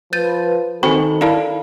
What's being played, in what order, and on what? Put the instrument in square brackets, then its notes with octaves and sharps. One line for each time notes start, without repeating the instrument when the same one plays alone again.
[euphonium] F3 [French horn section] B4 [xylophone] G6 A6 D#7
[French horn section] D#3 [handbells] C4 F#4 B5 [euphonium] A4 [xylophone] C5 G#5
[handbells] D#4 E4 A#4 [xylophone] D5 F5 A5